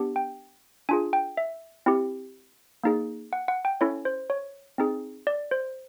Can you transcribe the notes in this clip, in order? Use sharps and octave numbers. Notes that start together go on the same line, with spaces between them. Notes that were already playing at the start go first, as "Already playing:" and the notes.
Already playing: B3 D4 G4
G5
D4 F4 G#4 G#5
G5
E5
C4 E4 G4
A#3 D#4 G#4
F#5
F#5
G5
C#4 E4 A4 C#5
C5
C#5
C4 D#4 G#4
D5
C5